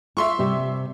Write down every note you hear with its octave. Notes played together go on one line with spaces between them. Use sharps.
F4 E5 C6 C#6
C3 G3 C4